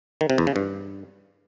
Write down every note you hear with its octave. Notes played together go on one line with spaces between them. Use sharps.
D#3
C3
E2
C#3
G2